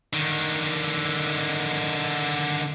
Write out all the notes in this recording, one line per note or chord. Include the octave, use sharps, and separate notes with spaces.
D3 D#3